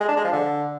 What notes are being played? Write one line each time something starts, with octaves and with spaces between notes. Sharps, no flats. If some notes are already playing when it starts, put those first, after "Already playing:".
G#3
D4
G#3
F3
D3